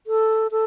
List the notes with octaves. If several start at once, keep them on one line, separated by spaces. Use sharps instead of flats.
A4
A4